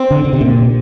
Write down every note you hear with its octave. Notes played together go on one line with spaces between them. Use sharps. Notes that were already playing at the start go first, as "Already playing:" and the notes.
Already playing: C4
D3
D3
C3
A#2